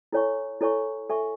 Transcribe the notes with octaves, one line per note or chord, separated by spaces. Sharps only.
E4 A4 C#5 G#5 C#6
E4 A4 C#5 G#5 C#6
A4 E5 G#5 C#6